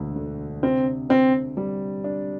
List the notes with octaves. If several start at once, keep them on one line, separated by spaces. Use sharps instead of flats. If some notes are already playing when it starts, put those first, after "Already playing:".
Already playing: E1 D2 A3
D3
C3 C4
C4 C5
G3
D4